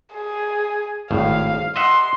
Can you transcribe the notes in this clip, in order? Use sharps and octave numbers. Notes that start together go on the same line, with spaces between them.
G#4
G#1 A2 F5
D#5 E5 F#5 C6